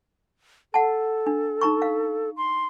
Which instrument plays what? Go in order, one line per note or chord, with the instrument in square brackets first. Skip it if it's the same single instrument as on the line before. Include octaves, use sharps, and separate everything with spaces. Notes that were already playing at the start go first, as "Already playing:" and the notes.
[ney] A4 [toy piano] F#5 A5
[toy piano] D4
D#4 A#5 C#6
F5
[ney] C6